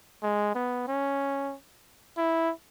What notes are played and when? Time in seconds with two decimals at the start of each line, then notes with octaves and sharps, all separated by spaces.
0.23 G#3
0.55 B3
0.87 C#4
2.18 E4